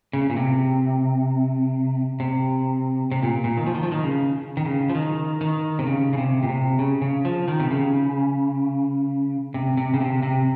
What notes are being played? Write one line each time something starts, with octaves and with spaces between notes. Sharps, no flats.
C#3
A#2
C3
C3
C3
A#2
A#2
D#3
F3
D#3
F3
D#3
C#3
D#3
C#3
F3
D#3
D#3
C3
C#3
C#3
C3
A#2
C3
C#3
C#3
F3
D#3
C3
C#3
C3
C3
C#3
C3
C3